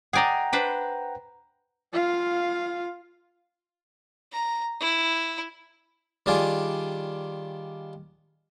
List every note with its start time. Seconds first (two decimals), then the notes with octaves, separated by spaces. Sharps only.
0.13 G#4 D5 D#5 F#5 G5 A#5
0.53 D4 B4 C5
1.93 F4 F5
4.32 A#5
4.80 E4
6.26 D#3 G3 D4 F4 G#4